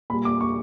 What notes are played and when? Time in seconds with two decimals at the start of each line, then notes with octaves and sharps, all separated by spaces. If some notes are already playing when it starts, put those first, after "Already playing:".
0.10 A#2 B5
0.13 G3
0.25 D6
0.41 C#6